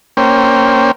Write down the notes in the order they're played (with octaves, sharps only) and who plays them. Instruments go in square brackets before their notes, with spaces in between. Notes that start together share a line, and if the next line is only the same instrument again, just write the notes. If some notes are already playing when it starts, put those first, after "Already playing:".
[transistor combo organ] A#3 C#4 C5 G5